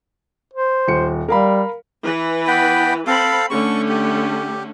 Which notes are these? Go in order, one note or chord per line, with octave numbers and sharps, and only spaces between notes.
C5
D#1 C#7
G3 A#4 F5 B5
E3 B4
B3 G5 B5
C4 A4 F5 B5
D3 A3 C#4 C#6
G4